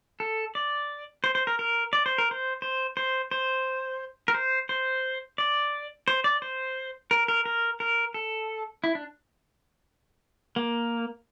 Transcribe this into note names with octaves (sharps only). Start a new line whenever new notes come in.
A4
D5
C5
C5
A#4
A#4
D5
C5
A#4
C5
C5
C5
C5
A#4
C5
C5
D5
C5
D5
C5
A#4
A#4
A#4
A#4
A4
E4
D4
A#3